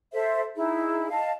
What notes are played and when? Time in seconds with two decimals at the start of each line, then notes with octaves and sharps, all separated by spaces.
0.12 A4 C5 E5
0.55 D#4 E4 G#4
1.10 D#5 F5 A5